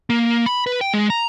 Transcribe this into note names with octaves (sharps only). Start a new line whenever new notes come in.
A#3
B5
B4
G5
G#3
A#5